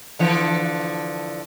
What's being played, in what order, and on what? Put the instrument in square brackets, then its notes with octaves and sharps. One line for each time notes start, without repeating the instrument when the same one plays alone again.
[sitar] D3 E3 F3